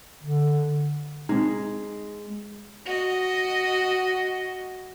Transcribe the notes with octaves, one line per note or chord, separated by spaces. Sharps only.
D3
G#3 C4 D#4
F#4 D#5